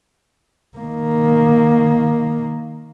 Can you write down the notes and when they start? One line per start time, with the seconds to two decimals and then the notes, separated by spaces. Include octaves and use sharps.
0.78 D#3 A#3